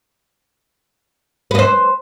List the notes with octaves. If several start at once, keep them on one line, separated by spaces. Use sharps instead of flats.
B4 C5 D#5